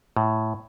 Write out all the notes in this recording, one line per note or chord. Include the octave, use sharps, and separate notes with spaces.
A2